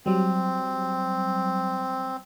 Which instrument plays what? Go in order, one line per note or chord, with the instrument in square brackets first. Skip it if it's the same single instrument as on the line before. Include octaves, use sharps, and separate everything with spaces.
[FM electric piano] F#3 G3 [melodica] C4